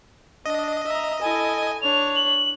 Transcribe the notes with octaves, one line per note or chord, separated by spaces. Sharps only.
D4 D#5
E5 A#5
E4 A4 G#5
D4 C#5 F7
F#7